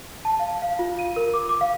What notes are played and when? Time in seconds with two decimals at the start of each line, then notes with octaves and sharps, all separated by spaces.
0.25 A5
0.40 F5
0.62 F5
0.79 F4
0.99 D#7
1.16 A#4
1.34 D6
1.49 D6
1.61 F5